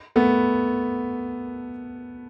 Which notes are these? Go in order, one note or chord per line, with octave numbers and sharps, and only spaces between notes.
A3 B3